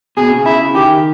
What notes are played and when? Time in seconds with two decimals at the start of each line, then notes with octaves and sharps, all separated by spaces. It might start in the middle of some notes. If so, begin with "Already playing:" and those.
0.17 B2 G#4
0.32 C#3
0.46 E4
0.75 D#3 G4